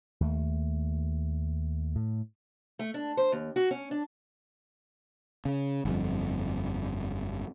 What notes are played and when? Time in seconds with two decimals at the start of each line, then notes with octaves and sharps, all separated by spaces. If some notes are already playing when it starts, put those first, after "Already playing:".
0.21 D#2 A3
1.95 A2
2.79 A3
2.94 D4
3.17 C5
3.32 D#2
3.56 F#4
3.71 C#4
3.91 D4
5.45 C#3
5.85 G1 F2